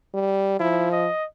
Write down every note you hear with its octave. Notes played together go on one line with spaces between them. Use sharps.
G3
F3 E4
D#5